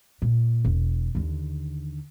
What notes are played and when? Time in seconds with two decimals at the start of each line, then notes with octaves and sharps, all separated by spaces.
0.22 A#2
0.65 E1
1.15 D#2 D3